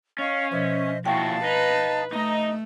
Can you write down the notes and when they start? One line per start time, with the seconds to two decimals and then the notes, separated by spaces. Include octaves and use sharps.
0.19 C#4 D#5 F5 C#6
0.51 B2 F3 C5 D#5 E5
1.06 A#2 F3 E4 F#4 F5 G5 A5 C#6
1.44 D#4 B4
2.12 A3 D#4 D#5 A#5